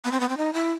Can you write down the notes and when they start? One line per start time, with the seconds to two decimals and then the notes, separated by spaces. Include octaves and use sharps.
0.04 B3
0.12 C4
0.20 B3
0.29 C4
0.37 D#4
0.53 E4